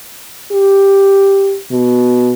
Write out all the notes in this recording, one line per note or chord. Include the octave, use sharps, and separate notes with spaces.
G4
B2